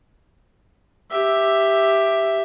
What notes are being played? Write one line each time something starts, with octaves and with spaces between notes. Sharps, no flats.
G4 E5